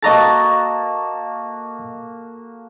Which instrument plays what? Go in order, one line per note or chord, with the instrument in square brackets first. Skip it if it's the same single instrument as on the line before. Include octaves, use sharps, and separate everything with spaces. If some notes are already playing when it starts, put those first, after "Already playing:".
[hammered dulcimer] A#3 F#4 A4 [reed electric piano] D#5 A#5 A6